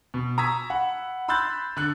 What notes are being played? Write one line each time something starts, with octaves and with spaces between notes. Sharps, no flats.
B2
A#5 C#6 D#6 E6 G#6 B6
F#5 B5
B5 C6 E6 F#6 G6 A6
D3 F#6